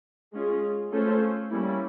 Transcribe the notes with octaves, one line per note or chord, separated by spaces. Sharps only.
G#3 C#4 F4 G#4
A3 C#4 F4 A4 C5
G3 A#3 C#4 E4